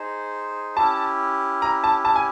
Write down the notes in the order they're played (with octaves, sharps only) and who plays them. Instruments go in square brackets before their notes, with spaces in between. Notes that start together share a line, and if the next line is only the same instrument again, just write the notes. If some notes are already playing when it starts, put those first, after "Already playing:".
Already playing: [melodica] D#4 G#4 C5
[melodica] C#4 E4 G4 [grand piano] A5
[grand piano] A#5
A5
A5
G#5